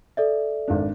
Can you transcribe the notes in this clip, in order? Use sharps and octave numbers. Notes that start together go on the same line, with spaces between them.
A4 D5 E5
G#1 D4